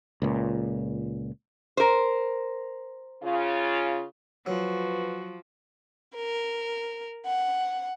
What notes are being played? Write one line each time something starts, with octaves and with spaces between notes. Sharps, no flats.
C#2 A#2
A#4 C5
C#3 F4
F3 F#3 F#4 B4
A#4
F#5